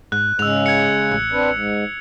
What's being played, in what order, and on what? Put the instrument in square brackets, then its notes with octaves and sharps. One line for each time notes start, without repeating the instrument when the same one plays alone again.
[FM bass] G#2 [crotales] F#6
[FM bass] G#2 [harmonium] C#3 G#3 [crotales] E6 F7
[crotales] G#6 C#7
[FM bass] A1
[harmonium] C4 D4 B4
G#2